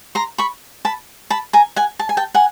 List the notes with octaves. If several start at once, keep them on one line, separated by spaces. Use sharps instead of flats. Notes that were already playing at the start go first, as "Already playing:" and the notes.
A#5 C6
B5 C#6
A5 B5
A5 B5
G#5 A#5
F#5 G#5
A5
G#5
G5 A5
F#5 G#5